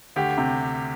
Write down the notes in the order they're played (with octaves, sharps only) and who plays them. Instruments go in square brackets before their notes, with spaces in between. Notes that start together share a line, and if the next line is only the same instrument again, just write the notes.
[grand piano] D2 G4
C3